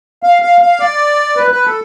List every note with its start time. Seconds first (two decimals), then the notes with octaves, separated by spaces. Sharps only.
0.23 F5
0.42 F5
0.61 F5
0.80 D5
1.37 B4
1.51 B4
1.65 A4